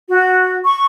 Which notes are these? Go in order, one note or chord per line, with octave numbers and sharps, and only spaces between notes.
F#4
C#6